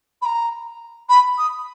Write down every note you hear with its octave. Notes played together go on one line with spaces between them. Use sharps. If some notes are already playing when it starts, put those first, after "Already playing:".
B5
A#5
B5
D#6